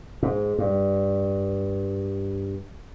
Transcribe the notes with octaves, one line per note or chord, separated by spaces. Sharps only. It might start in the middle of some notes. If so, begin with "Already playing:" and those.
G#2
G2